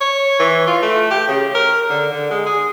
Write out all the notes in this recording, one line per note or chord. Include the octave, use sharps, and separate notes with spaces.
C#5
E3
F4
A3
G4
C#3
A#4
D3
D3
G#3
G#4